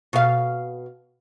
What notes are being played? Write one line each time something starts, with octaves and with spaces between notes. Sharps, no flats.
B2 F5